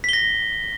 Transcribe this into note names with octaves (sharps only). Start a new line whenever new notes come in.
A#6 B6 G7